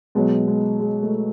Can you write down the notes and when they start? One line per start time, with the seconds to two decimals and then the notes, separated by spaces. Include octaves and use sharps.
0.15 B2 F#3 G#3
0.48 G#3
0.80 G#3
1.03 A3